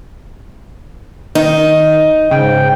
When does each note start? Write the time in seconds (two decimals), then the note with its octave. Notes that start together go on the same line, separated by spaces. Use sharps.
1.35 D#3 D#4
2.31 G#2 C#3 G5